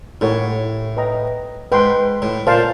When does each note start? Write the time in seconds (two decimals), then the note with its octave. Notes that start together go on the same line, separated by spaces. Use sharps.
0.21 A2 E4 G4 A#4 C#5 F#5
0.97 B4 D#5 G5 A#5
1.72 G#2 B4 D#5 G5 C6
2.22 A2
2.47 A#2 C5 F5 A5